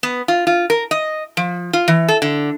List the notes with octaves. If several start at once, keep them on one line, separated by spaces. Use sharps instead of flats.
B3
F4
F4
A#4
D#5
F3
F4
E3
A4
D3